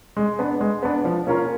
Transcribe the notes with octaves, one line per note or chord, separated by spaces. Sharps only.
G#3
B3 D4
G#3
B3 D4
F3
A#3 C#4 F4 A#4